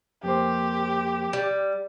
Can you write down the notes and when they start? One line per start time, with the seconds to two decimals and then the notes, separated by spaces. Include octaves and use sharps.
0.23 F2 A#3 G4 C5
1.33 G3